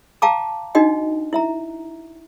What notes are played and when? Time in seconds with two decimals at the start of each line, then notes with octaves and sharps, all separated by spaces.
0.22 F5 G5 A5 A#5 D6
0.75 D4 D#4 F#4 D#5 G5
1.33 E4 E5 A#5